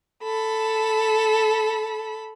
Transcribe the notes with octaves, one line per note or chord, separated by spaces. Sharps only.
A4 B5